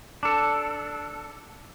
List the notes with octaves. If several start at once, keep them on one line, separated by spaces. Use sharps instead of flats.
D4 A4